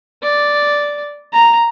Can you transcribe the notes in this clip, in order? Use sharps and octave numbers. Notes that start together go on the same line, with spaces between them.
D5
A#5